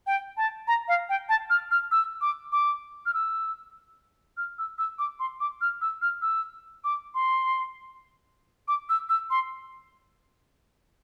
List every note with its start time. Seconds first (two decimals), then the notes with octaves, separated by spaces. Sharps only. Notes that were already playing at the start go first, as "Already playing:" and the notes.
0.07 G5
0.37 A5
0.68 A#5
0.88 F5
1.09 G5
1.29 A5
1.50 F6
1.71 F6
1.91 E6
2.21 D6
2.52 D6
3.06 F6
3.14 E6
4.37 F6
4.59 E6
4.79 E6
4.99 D6
5.20 C6
5.40 D6
5.61 F6
5.81 E6
6.02 F6
6.22 E6
6.84 D6
7.15 C6
8.68 D6
8.89 E6
9.09 E6
9.30 C6